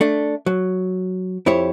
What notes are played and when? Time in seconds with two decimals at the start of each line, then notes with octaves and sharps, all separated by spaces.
0.01 A3 D4
0.46 F#3
1.46 F2 E4 G4 C#5